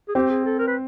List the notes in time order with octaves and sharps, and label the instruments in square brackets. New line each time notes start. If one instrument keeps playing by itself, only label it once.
[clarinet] G#4
[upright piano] C4 [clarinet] G4
[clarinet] G#4
A4
A#4
B4